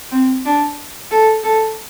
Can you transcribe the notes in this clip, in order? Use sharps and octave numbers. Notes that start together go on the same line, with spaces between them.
C4
D4
A4
A4